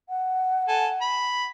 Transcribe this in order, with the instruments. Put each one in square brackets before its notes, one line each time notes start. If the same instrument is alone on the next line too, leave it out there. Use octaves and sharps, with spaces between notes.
[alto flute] F#5
[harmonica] A4 G#5
B5